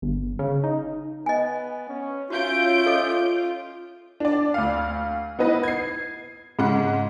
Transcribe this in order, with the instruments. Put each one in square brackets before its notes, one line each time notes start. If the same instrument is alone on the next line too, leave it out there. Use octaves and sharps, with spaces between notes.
[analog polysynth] G1
C#3
D#4
[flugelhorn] B3 [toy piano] D#5 G#5
[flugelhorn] C#4
[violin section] C#4 G6 D7 [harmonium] F4 [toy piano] F#4 F5 [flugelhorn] E5
[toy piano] A4 D#5 D6
[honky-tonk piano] D4 D5
D2 F5
B3 D#4 E4 B4 D#5
G#6 C7
G#2 C#3 F#5